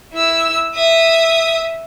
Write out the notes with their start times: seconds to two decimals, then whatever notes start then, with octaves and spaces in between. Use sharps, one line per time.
0.13 E4 E6
0.75 E5 D#6